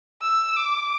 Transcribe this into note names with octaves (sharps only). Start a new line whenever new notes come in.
E6
D6